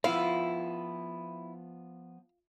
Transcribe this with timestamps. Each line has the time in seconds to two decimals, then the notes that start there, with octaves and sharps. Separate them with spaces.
0.04 F3 B3 E4 F4 F5